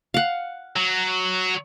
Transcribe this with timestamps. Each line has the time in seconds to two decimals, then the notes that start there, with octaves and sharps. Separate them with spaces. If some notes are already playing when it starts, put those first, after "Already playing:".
0.14 F5 F#5
0.76 F#3